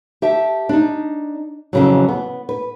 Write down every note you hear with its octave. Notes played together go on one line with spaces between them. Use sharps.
G4 E5 A5
D4 D#4
F2 A#2 C#3 E3 F#3
B3
B4